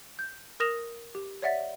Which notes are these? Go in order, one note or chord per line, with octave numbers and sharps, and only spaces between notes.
G6
A#4 D#6 A#6 E7 F7
G4
C#5 D5 E5 F#5 A6 B6